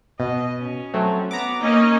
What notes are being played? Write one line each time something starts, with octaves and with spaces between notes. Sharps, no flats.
B2 D#5
C#4
F#3 A3 C4
B3 A#5 D6
A#3 C#4 D#4 D#5